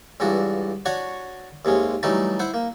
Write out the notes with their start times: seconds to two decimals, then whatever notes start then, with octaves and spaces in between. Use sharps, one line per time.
0.20 C#2 G2 E3 D4 F#4
0.86 D4 F#4 C#5 F#5 C#6
1.65 D#2 C3 G#3 C#4
2.03 E3 F#3 G3 A3 D4 D#4
2.39 E4 C5 F#5
2.54 A#3